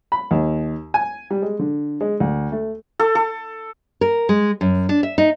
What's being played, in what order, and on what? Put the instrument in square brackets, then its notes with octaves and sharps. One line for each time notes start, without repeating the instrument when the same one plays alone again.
[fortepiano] B5
D#2
G#5
G3
G#3
D3
G#3
D2
A3
[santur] A4
A4
[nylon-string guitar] A#4
G#3
F#2
D4
E5
D#4